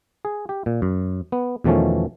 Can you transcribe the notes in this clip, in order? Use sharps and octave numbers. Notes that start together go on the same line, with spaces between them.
G#4
G4
A#2
F#2
B3
E2 B2 D#3 F3 A3 C#4